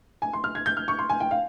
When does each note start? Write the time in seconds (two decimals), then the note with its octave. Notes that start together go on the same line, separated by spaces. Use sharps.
0.22 G#5
0.33 C6
0.44 F6
0.55 G#6
0.66 G6
0.77 F6
0.88 C#6
0.99 C6
1.09 G#5
1.20 G5
1.31 F5